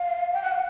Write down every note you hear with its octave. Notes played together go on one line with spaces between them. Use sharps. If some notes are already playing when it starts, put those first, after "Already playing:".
Already playing: F5
G5
F#5
F5